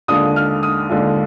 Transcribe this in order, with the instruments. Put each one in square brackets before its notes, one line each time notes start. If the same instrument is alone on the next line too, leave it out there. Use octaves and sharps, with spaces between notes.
[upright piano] D#2 D3 G#3 D4 F4 D#6
F6
D#6
D#2 D3 G#3 D4 F4